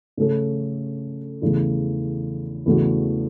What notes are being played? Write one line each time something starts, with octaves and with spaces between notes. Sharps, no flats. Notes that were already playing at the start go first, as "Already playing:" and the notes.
C#3 A3 C#4 A4
E2 C#3 A3
E2 C#3 A3 F#4